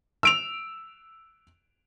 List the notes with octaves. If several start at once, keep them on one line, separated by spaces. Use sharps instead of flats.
E6 D7 F7